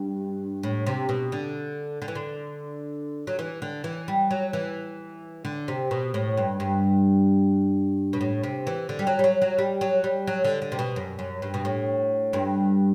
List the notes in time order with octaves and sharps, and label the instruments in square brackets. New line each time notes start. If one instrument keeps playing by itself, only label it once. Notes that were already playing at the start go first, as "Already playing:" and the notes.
Already playing: [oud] G2
A2
C3
B2
D3
D3
E3
D3
F#3
E3
D3
E3
G3
F#3
E3
D3
C3
B2
A2
G2
G2
B2
A2
C3
E3
D3
G3
F#3
G3
F#3
F#3
G3
F#3
G3
F#3
D3
D3
C3
B2
F#2
F#2
G2
B2
A2
G2